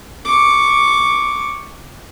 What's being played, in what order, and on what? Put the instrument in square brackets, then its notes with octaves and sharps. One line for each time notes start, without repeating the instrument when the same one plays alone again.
[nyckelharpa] C#6 D6